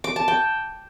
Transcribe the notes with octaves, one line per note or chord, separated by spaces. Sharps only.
D6
A5
G5